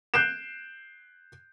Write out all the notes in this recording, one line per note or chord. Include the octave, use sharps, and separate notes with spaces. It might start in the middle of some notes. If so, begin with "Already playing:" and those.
F#6 G6 C7 D7 E7